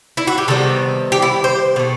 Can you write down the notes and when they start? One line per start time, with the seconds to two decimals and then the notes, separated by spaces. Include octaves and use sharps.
0.17 E4
0.27 F#4
0.38 G4
0.48 C3 D#3 G3 B3 A4
1.12 G4
1.22 E4
1.44 C5
1.76 B2 A3